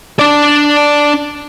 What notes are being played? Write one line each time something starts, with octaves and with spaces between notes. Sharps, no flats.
D4 D5